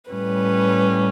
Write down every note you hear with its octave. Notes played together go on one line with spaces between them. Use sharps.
A2 G3 C#4 B4